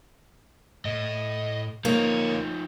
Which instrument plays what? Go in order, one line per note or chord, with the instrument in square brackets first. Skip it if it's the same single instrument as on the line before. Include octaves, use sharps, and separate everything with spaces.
[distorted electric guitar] A2 [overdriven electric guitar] D#5
[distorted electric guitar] D2 C#5 [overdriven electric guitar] F3 D#4 [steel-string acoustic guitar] A#3